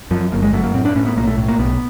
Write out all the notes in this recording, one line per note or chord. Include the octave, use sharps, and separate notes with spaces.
F#2 F3
G1 A#3
G#3
F#2 A3
A#3
A2 C4
D4
A2 C#4
B3
B1 A#3
A3
A2
A#3
B1 B3